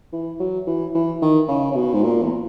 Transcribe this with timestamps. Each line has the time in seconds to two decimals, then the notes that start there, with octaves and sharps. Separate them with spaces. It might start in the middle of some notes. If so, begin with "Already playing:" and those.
0.12 E3
0.40 F#3
0.67 E3
0.94 E3
1.22 D#3
1.48 C#3
1.71 C#3
1.75 B2
1.93 G#2
2.03 A#2
2.22 E2